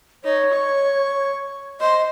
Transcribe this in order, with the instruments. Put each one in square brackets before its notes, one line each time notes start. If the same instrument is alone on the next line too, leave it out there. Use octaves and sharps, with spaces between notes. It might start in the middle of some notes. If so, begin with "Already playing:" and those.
[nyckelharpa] D#4 [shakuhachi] C#5
[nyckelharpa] C#6
[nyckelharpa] C5 [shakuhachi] D#5